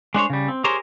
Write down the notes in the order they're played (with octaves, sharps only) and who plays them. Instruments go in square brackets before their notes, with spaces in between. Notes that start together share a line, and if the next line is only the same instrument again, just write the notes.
[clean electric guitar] G#3 D4 C5 C#5
C#3 G3
C4
G4 G#4 A#4 C5 C#5 A#5